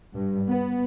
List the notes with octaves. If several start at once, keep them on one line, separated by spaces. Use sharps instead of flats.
G2
B3